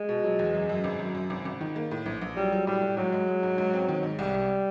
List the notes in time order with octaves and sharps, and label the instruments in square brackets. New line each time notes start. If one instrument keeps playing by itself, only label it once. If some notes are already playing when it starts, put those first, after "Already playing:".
Already playing: [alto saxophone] G#3
[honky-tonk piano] B2
F#3
E2
F#2
F#2
G#1
F#2
F#2
G#1
G#1
D#3
A#3
A2
A#1
A#1
[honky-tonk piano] F#3 [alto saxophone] G3
[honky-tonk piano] F#3
[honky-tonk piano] A2 [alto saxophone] G3
[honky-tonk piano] A2
[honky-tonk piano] G#2 [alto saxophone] F#3
[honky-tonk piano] G#3
G#3
G#2
G#2
C4
D#3
G#2
[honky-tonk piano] C2 [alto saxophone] G3
[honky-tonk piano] C2